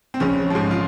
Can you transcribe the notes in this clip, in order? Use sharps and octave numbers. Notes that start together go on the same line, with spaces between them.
C4
A#1 C#3 C#4
G#2 F3
F4